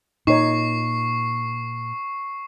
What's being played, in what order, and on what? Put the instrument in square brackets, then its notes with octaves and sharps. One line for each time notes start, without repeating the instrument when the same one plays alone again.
[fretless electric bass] A#2 [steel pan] D#4 C#5 [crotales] C#6 C7